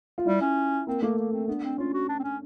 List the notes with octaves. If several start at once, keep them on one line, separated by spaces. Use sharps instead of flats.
F4
G3 E4
C#4
A#3 C4
A3 A#3
A#3
C4
B3 D4
C4
C#4 F4
F#4
D4
C4
C#4